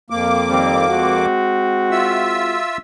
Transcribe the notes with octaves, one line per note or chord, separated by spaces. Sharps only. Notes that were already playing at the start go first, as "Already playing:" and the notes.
F2 A#3 D6
D#3 G3 C4
G#3 C4 F#4
F4 E5 E6